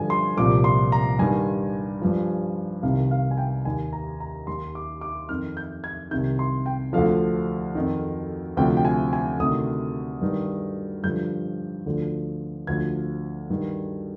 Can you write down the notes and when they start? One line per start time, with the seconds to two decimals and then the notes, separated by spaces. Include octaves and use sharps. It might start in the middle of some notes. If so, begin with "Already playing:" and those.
Already playing: G2 D3 F3 G#5
0.10 C6
0.37 C2 A#2 F3 D6
0.64 C6
0.92 A#5
1.19 G2 D#3 G#5
2.01 G2 F3
2.83 C2 C3 D#3 F5
3.11 F5
3.31 G#5
3.37 G5
3.65 D#2 D#3 G#5
3.93 A#5
4.20 A#5
4.47 D#2 D#3 C6
4.75 D6
5.01 D6
5.29 F2 D#3 F6
5.57 G6
5.84 G#6
6.11 C2 C3 D#3 G6
6.39 C6
6.66 G5
6.93 D2 D3 F3 F5
7.75 F2 D#3
8.57 D2 C3 F3 G5
8.77 G5
8.85 G#5
9.13 G#5
9.39 D2 C3 D#3 D#6
10.21 G2 D#3
11.04 G2 D3 F3 G6
11.86 D2 D3 F3
12.67 D2 D3 F3 G#6
13.50 G2 D#3